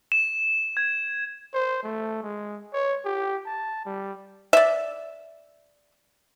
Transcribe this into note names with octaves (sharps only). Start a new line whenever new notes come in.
E7
G#6
C5
A3
G#3
C#5
G4
A5
G3
D5 E5